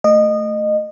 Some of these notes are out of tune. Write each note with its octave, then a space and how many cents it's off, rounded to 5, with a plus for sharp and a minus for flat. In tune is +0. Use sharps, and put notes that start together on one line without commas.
A3 +5 D#5 -20